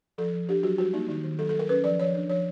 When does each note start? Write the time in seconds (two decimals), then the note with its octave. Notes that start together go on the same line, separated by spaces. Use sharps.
0.18 F3 A4
0.33 F3
0.49 D4 G4
0.63 F#3 F#4
0.78 G3 F#4
0.93 A#3 D#4
1.08 D#3 D#4
1.24 D#3
1.39 F#3 A4
1.49 F#3 A4
1.59 A#4
1.69 C#4 B4
1.84 F3 D5
1.99 F3 C#5
2.15 D4
2.29 F3 C#5